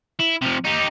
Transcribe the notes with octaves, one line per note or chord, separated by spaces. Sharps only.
E4
C3 F3
D#4 G4